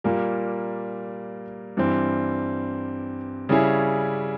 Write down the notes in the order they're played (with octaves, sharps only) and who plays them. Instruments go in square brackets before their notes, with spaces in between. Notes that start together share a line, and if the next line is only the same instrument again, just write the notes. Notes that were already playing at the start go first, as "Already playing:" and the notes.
[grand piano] A#2 G3 A#3
G2 E3 G3 C4
C#3 G3 C#4 E4 G#4